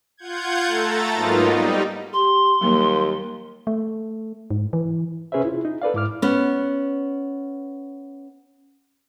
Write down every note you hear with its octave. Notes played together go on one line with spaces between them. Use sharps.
F4 F#5 G6 G#6
A3 A4 A#5 A6
G#2 F#3 A#3 B3 D#4 F4
G3 D#4
G4 C6
D#2 F#3 G3 A#3
A3
G#2
E3
C3 C#4 G#4 B4 C5 E5
E4 F4
D#4
A4 B4 D5 F5
G#2 E4 D6 F6
B3 C#4